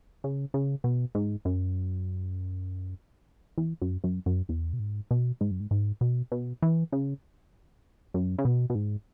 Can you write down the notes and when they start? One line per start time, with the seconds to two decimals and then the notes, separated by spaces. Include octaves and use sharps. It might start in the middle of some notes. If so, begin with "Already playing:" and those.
0.24 C#3
0.54 C#3
0.84 B2
1.15 G#2
1.45 F#2
3.58 E2
3.82 F#2
4.04 F#2
4.26 F#2
4.49 E2
4.73 B2
4.79 G#2
5.11 B2
5.41 G#2
5.51 F#2
5.60 G#2
5.71 G#2
6.01 B2
6.32 B2
6.62 E3
6.92 C#3
8.14 F#2
8.38 C#3
8.45 B2
8.70 B2
8.75 G#2